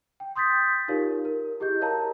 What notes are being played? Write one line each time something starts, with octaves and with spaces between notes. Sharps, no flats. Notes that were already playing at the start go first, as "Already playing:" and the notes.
G5
C6 D#6 G6 A6 B6
D#4 F4 G4 A#4 C#5 F5
A#4
E4 G4 G#4 D#5 G6
A#4 C#5 F5 A5 A#5